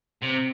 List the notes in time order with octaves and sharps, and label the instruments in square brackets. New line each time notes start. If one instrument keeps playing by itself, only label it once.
[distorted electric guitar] C3 [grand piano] C4